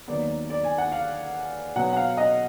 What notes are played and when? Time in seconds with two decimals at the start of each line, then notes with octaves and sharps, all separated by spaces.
0.08 D#2 D#3 F#3 B3 D5
0.50 D5
0.64 G#5
0.78 F#5
0.92 F5
1.76 B2 F#3 B3 F#5
1.93 F#5
1.97 F5
2.17 D#5